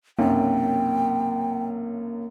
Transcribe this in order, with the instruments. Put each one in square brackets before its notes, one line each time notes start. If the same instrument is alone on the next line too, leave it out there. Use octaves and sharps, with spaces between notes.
[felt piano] B1 F#2 C3 [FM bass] A#3 [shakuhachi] G5